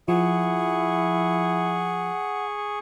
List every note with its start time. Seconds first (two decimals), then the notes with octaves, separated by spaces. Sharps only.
0.08 F3 E4 G#4 F#5 C#6